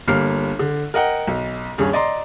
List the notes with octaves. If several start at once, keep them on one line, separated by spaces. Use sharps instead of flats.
G1 G3 A#3 F6 C7
D3
A#4 D#5 F#5 G5
B1
D#1 G2 C#4 G#4
D5 D#5 A#5 C6